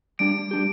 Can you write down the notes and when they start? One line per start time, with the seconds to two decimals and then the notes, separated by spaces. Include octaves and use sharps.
0.19 G3 D4 G4 D7
0.51 G3 D4 G4